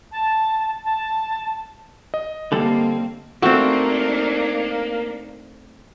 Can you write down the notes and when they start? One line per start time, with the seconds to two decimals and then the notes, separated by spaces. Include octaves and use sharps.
0.12 A5
0.85 A5
2.14 D#5
2.52 D3 G3 A#3 C4 A4
3.42 A3 A#3 C4 D4 D#4 F#4